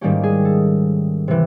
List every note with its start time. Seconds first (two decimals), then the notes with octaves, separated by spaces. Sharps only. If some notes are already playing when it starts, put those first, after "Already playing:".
0.01 G#2 D#3 G3 A#3 C#4 G4
0.23 G#4
0.45 A4
1.28 C3 E3